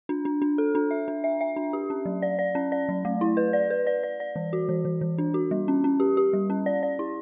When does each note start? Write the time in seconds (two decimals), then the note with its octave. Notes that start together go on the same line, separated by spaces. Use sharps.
0.09 D4
0.25 D4
0.42 D4
0.58 A4
0.75 D4
0.91 E5
1.08 D4
1.24 E5
1.41 E5
1.56 D4
1.73 G4
1.90 C#4
2.05 F#3
2.22 D5
2.39 D5
2.55 C#4
2.72 D5
2.89 F#3
3.05 A3
3.21 E4
3.37 B4
3.53 D5
3.70 B4
3.87 D5
4.03 D5
4.20 D5
4.36 E3
4.53 F#4
4.69 E3
4.85 E3
5.01 E3
5.18 D4
5.34 F#4
5.51 G3
5.68 C#4
5.84 C#4
6.00 G4
6.17 G4
6.33 G3
6.50 C#4
6.66 D5
6.83 D5
6.99 E4